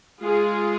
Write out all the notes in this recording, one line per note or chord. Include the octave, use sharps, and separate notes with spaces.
G#3 F4 G#4